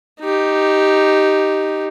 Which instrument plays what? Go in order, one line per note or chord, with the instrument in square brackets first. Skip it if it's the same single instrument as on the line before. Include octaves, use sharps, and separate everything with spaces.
[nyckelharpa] D#4 G4